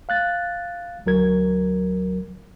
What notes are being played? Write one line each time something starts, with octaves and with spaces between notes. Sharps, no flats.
F5 F#6 A6
D2 F#3 A#4 G#6